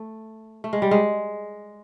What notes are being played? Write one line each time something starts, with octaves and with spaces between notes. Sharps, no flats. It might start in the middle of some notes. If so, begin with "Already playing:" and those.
Already playing: A3
A3
G#3
G3
G#3